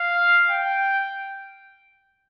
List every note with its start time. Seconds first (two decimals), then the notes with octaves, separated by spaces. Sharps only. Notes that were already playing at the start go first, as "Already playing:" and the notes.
Already playing: F5
0.50 G5